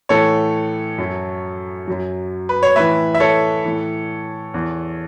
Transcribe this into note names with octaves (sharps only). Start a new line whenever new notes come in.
A2 E3 A4 C#5
F#2 F#3
F#2 F#3
B4
C#5
A2 E3 B4 E5
E5
A4 C#5
A2 E3
E2 E3